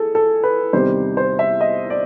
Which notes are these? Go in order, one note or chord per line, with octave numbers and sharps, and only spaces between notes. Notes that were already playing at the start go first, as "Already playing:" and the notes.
Already playing: G#4 A4
A4
B4
E2 C3 D#3 G3 C5
C5
E5
D#5
D5